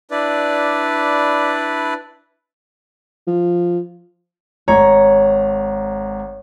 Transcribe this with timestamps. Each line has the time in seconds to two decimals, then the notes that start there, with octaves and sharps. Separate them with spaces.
0.11 D4 E4 B4 D5
3.27 F3
4.68 G#1 C#5 A#5